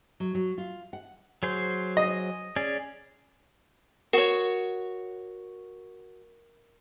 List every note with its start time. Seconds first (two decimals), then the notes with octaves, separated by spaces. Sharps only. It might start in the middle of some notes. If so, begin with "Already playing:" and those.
0.20 F#3
0.35 F#3
0.58 F4
0.93 F#5
1.43 F#3 G#4 C5
1.97 D#5
2.56 C#4 G#4 D5
4.13 F#4 A#4 C#5